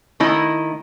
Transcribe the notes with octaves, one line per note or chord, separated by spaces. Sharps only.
D#3 A3 E4 D#5